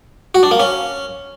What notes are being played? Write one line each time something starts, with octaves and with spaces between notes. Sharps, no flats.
F#4
D4
A#3
C#4